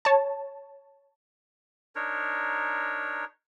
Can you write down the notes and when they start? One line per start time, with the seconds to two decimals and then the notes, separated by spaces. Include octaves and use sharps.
0.05 C#5 A5
1.95 D4 D#4 A#4 C#5